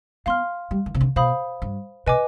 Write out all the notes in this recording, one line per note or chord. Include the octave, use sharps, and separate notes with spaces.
B3 F5 C6 F6
G3
D#3
C3
D3
B2 C5 F5 B5 D#6
G2
B2 B4 D#5 G#5 D6